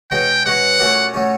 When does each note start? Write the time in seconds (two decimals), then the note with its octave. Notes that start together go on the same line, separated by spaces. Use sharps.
0.11 B2 G#3 C#4 F#4 G5
0.46 B2 G#3 C#4 F#4 F#5
0.79 A#2 F#3 A3 C#4
1.14 A#2 F#3 A3 C#4